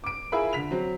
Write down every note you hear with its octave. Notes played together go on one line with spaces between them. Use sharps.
D6 D7
E4 F4 G#4 A#4 E5 B5
D3 B6 F7
F#3 C4